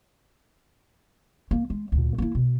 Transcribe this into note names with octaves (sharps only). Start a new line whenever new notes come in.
A#3
G#3
D2 A#2
A#3 E4
B2